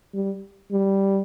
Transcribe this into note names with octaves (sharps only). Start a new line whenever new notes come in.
G3
G3